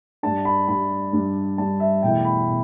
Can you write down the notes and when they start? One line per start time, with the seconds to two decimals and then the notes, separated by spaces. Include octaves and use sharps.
0.23 G2 G3 D4 A5
0.45 B5
0.68 G2 G3 D4 B5
1.13 G2 G3 D4
1.58 G2 G3 D4 A5
1.80 E5
2.02 E2 B2 A3 E4 G5
2.25 B5
2.48 B2